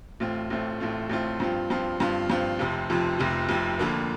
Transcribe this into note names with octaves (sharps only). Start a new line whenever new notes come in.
A1 A2 A3 C4 F4
A1 A2 A3 C4 F4
A1 A2 A3 C4 F4
A1 A2 A3 C4 F4
G2 F3 C4 F4
G2 F3 C4 F4
G2 F3 C4 F4
G2 F3 C4 F4
F1 F2 C3 F3
F1 F2 C3 F3
F1 F2 C3 F3
F1 F2 C3 F3
F2 D3 F3 A#3